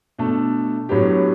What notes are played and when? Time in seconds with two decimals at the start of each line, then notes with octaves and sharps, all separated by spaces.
0.19 B2 A3 D4 A4
0.89 A2 F#3 B3 D4 G4